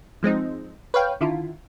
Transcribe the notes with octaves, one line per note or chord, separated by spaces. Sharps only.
F3 G#3 C4 D#4
B4 C#5 F5 G5
D3 D#3 E4 F4